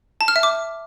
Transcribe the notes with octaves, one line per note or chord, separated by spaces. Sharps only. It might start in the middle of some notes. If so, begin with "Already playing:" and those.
A5
F6
E5
D6